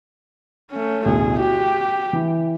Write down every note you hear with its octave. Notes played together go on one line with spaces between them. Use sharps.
A3 C#4
A1 D2 B2 G#4
F#4 G4
E3